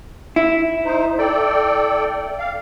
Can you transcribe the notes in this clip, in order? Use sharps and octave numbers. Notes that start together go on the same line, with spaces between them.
E4
D#4 C5
A4 D5 G5
F5